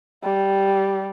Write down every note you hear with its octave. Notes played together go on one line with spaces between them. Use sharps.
G3